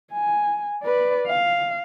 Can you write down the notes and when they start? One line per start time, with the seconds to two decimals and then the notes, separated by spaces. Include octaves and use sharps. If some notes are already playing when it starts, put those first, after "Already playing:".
0.13 G#5
0.83 B4 D5
1.28 F5